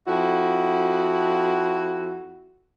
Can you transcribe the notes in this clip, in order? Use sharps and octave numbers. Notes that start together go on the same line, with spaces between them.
F2 E4 F#4